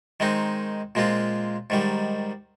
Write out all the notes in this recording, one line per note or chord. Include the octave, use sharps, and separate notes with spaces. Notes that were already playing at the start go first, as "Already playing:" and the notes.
D#3 G#3 C4 D#4
A#2 G#3 C4 F4
G#2 D#3 G3